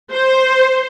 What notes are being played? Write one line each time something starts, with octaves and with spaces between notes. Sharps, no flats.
C5